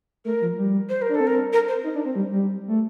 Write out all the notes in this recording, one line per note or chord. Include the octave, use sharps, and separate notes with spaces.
A3 A#4
F3
G3
C5
A#4
D4
A4
C4
A#4
A#4
C5
D#4
D4
C4
G3
G3
A3